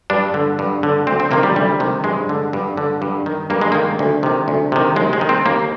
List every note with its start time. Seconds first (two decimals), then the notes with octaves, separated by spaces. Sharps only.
0.10 G2 D4
0.34 D3
0.59 G2
0.83 D3
1.07 D2 C4
1.20 C4
1.31 C3 D#3 A#3
1.43 G3
1.56 D2 G3
1.80 C3 D#3
2.04 G2 G#3
2.29 D3
2.53 G2
2.77 D3
3.02 G2
3.26 D#3
3.50 G2 A#3
3.61 G#3
3.72 D#3 A#3
3.99 D2
4.23 C3 D#3
4.48 D2
4.72 C3 D#3
4.96 D#2 G#3
5.13 G#3
5.21 D#3
5.29 C4
5.46 D#2 A#3